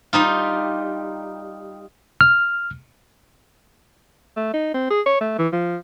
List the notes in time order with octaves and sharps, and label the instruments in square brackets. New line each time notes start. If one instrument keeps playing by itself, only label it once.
[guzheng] G3 D#4 F4
[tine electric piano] F6
[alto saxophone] A3
D#4
C4
G#4
C#5
A3
E3
F3